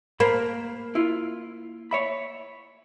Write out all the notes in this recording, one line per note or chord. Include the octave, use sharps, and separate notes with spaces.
A#3 C5 A5 B5
E4 F4
C#5 E5 B5